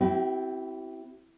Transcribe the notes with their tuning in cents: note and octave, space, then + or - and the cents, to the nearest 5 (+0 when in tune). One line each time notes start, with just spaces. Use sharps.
C4 -5 E4 +0 G4 -45